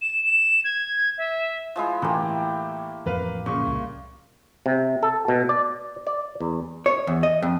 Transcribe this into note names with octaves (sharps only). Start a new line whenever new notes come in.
E7
E7
G#6
E5
F3 G#3 E4
A2 E3 A#3 G4
A1 F2 F3 A#4 B4 F5
A#2 C#3 C#6
C2
C3
A4
B2
D5
D5
E2
C#5
E2
D#5
F2